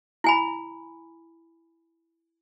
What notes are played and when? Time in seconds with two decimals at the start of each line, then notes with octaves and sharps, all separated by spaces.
0.24 E4 G#5 B5